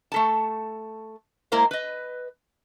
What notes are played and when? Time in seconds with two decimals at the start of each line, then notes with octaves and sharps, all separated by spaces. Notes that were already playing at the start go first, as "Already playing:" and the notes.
0.12 A3 A4 A5
1.52 G#3 A#3 E4 A#4 C5 F5
1.71 B4 D#5